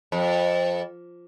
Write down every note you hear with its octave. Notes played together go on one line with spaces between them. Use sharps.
F2